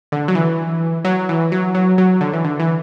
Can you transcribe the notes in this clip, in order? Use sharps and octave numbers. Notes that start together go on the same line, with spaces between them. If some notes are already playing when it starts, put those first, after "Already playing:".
D3
F#3
E3
F#3
E3
F#3
F#3
F#3
D3
E3
D3
E3